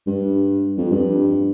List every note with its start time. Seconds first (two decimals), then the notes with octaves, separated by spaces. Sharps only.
0.07 G2
0.77 F2
0.91 G2